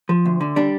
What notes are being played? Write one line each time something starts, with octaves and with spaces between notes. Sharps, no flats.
F3
D2
D3
G3 D4 D5